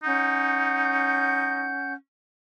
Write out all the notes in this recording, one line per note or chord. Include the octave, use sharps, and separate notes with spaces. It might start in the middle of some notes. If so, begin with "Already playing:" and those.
C#4 D#4 F#5 G6